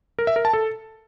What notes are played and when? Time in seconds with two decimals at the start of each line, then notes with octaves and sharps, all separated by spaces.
0.19 A#4
0.27 E5
0.36 A#4
0.45 A5
0.53 A4